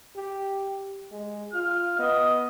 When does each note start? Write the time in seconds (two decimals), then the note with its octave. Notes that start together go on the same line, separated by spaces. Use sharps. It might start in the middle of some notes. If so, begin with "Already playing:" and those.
0.16 G4
1.12 G#3
1.53 F4 F6
1.99 B3 D#5